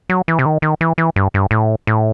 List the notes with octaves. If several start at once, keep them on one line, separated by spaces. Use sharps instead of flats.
F#3
E3
C3
D#3
D#3
E3
E3
G2
G2
A2
A2